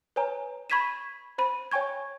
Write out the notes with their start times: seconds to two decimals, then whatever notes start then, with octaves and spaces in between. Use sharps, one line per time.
0.16 B4 C#5 G#5 A#5
0.70 B5 C#6 G#6 B6 D#7 E7
1.38 C5 B5 D#7
1.71 C#5 G5 G#5 C#6 G#6